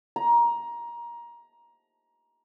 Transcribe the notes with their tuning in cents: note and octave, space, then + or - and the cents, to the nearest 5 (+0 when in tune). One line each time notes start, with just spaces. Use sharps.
A#5 +20